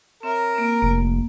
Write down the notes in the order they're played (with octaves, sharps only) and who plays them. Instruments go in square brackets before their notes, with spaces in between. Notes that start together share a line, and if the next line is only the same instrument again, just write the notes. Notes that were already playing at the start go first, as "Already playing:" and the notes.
[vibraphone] C4 C#5 E5 [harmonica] A#4
[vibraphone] A#3 C4
[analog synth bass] F1 [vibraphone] A#3